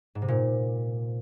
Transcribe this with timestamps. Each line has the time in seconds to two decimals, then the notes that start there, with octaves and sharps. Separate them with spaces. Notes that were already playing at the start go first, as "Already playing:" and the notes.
0.15 G#2
0.22 C3
0.28 A#2